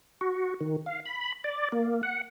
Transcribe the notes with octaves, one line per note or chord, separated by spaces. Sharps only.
F#4
D#3
F5
B5
D5
A#3
F#5